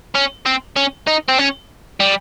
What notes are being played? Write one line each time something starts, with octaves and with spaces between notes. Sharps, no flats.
C#4
C4
C#4
D#4
C4
C#4
G3